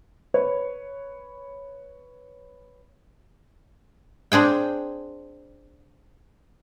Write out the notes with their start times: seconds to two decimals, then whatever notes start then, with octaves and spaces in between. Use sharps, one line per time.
0.34 B4 C#5
4.32 C4 D4 G#4 G5